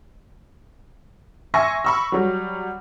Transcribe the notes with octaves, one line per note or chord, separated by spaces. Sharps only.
E5 G#5 C6 C#6 E6 A#6
B5 C#6 E6
F#3 G3